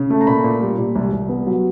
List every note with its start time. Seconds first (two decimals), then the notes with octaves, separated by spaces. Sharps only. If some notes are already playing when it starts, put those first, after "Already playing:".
Already playing: C#3
0.10 A3
0.21 A#5
0.27 A#2 B5
0.44 A#2
0.62 G3
0.78 A#2
0.96 C2
1.13 C2
1.29 B3
1.46 F#3